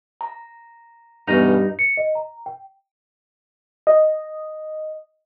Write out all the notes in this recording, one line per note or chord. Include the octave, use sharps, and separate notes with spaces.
A#5
B1 E2 G2 C#4 D#4
C#7
D#5
A#5
G5
D#5